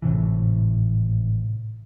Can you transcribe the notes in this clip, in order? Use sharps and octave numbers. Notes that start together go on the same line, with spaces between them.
G#1 A2 C3 E3